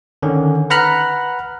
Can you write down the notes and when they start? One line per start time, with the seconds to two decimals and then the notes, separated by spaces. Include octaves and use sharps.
0.23 D3 D#3 C#4
0.70 B4 F#5 A#5 B5 F6 F#6